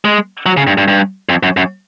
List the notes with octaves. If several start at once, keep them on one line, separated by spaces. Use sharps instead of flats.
G#3
F#3
C#3
G2
G2
G2
F2
F#2
F#2